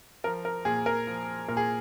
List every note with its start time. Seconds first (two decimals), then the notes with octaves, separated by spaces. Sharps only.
0.24 F3 A#4
0.45 A#4
0.65 A#2 G#4
0.86 A#4
1.07 F3
1.48 A#2 A#4
1.57 G#4